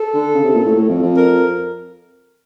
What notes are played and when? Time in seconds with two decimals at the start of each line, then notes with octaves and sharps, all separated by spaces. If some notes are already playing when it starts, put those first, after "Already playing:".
Already playing: A4
0.14 D3
0.34 C#3
0.44 C3
0.55 A#2
0.65 A2
0.75 A2
0.89 F2
1.03 F2
1.17 A#4